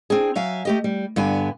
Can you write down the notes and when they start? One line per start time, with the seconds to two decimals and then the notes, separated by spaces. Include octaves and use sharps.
0.10 C4 D4 G#4
0.35 F#3 E5 F5 G#5
0.65 A3 G4 D#5
0.84 G3
1.16 G2 D3 B3 G#5